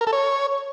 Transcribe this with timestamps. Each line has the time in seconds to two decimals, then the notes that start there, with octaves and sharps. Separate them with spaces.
0.01 A#4
0.07 A4
0.13 C#5